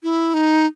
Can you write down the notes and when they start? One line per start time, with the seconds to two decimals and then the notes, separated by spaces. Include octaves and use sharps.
0.03 E4
0.34 D#4